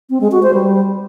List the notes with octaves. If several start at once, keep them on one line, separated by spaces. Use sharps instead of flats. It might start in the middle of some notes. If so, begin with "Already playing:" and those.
C4
G#3
F#4
C5
G3